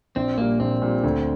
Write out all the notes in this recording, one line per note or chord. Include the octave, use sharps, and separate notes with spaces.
A#1 C4
A#2 G3 A#3
A#1 C4
A#2 G3
D2